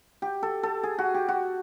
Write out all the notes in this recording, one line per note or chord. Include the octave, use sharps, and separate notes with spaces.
G4
A4
A4
G#4
F#4
G4
F#4